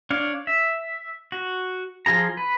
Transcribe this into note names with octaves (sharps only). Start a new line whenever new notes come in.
D4 C#5 F5
E5
F#4
F3 F4 G#4 A#5
B4